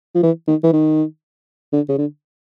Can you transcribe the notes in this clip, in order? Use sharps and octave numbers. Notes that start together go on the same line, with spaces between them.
F3
E3
D#3
E3
D#3
D3
C#3
D3